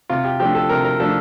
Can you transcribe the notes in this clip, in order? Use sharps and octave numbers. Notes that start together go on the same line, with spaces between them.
C3 F4
G4
F3 A3 D4 G4
A4
C3 A#4
A#4
F3 A3 D4 A4